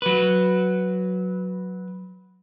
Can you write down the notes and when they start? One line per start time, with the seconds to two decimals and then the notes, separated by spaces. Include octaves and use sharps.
0.02 F#3 B4